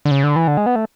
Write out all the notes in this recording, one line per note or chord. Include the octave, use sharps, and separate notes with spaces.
D3
C#3
D3
E3
D3
G#3
B3
A3